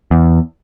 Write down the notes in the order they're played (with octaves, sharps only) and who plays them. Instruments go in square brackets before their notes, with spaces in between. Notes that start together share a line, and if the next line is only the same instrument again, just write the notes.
[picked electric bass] E2